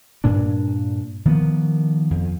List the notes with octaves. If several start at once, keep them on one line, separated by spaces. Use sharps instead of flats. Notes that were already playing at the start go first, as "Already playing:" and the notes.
G2 A#2 D4
D#3 F3 A#3 B3
F2